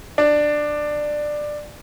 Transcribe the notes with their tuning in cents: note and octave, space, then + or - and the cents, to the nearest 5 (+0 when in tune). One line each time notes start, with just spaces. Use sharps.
D4 +15